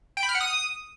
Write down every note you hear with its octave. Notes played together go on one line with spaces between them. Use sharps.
G5
B5
F6
F#5
D#6